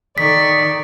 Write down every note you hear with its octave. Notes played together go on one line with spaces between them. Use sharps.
D#3 A4 D5 C#6 B6